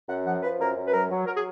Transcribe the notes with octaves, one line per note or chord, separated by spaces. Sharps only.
F#2 F#5
F3 F#5
F3 B4
F#2 A#4
F#2
B4
F#3 A#4
F#3
F#3 A#4
G#4